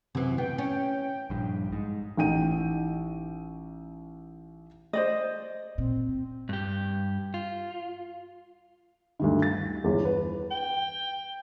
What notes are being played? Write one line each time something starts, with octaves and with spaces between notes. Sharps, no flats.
F#2 C3 E3
B3 G5
C#4
A#1 G2
G#2
A1 D#4 G5 D#7
C5 D5 D#5
A#2 C4
G2 G4
F4
D2 G2 D#3
A6
G1 E2
B4
G5